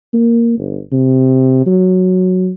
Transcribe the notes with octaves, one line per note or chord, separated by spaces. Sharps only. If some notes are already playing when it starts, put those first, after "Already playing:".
A#3
G1
C3
F#3